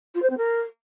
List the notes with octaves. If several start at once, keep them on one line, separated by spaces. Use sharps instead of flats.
F4
C5
C4
A#4